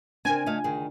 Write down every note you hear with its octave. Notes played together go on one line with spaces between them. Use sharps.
C#3 C4 D4 A#4 G#5
A3 F4 D#5 F5
D2 D#3 G#4